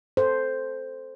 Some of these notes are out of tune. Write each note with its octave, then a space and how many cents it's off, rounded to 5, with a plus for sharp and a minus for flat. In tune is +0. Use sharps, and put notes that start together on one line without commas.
A4 +0 C5 +0